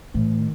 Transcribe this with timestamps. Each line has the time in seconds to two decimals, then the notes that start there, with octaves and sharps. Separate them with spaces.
0.14 A2 E3
0.38 D#3